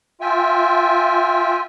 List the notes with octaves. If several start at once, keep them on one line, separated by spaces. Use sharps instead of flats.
F4 E5 G5 G#5